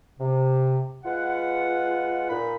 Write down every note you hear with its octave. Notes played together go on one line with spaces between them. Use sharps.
C3
G#3 F4 B4 F#5
A#2 D#4 B5